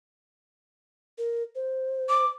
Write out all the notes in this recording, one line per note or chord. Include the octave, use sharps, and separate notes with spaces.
A#4
C5
D6